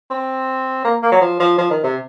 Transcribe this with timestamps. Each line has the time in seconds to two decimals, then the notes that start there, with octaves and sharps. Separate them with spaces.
0.11 C4
0.85 A#3
1.03 A#3
1.12 F#3
1.21 F3
1.40 F3
1.58 F3
1.70 D#3
1.83 C3